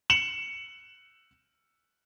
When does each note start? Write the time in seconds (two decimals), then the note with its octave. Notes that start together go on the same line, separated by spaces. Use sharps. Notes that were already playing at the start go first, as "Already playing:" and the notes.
0.10 C#7 E7 F#7